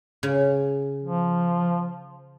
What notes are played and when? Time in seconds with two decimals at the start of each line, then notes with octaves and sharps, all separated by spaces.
0.23 C#3
1.02 F3